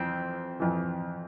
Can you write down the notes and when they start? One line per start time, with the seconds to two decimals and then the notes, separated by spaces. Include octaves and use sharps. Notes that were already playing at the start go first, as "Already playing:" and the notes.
Already playing: F2 E3 C4
0.60 F2 E3